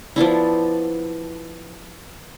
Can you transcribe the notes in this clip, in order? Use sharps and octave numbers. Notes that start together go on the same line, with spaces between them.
F3 B3 D4 E4